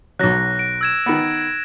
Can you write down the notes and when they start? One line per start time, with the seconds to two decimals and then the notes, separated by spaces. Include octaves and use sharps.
0.19 B1 F#3 F#6 A#6
0.59 D7
0.81 E6 G#6 E7
1.06 D#3 B3